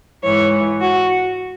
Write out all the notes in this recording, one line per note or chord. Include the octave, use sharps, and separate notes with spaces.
G#2 E3 C#5
F#4